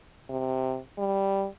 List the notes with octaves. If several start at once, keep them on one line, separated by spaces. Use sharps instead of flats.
C3
G3